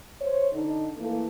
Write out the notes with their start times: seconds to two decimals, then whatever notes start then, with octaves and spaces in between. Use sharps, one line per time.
0.21 C5 C#5
0.52 D3 D4 D#4
0.98 E3 A3 A#3